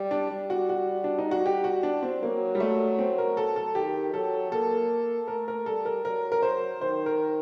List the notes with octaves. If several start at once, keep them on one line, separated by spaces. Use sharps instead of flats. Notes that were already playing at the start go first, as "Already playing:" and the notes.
Already playing: G3
D4
G3
F#4
F#4
D4
D#4
F#4
G4
F#4
D4
C4
F#3 A#3
G3
A3
C4
A#4
A4
A4
D#3 G4
F#3 A4
A#3 A4
A3 A#4
A#4
G3 A4
A#4
F#3 A#4
A#4
C5
D#3 C5
A#4